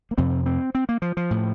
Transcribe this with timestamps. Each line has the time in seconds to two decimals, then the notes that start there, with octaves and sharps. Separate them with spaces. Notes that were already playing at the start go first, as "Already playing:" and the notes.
0.11 A#3
0.18 F2 C3 C4
0.46 C4
0.75 C4
0.89 A#3
1.02 F3
1.17 F3
1.31 A2